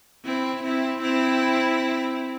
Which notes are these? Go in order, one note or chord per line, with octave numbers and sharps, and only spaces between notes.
C4 E4
C4 E4
C4 E4